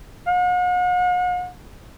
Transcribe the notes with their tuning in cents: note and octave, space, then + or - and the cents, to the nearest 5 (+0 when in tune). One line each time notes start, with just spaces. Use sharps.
F#5 -45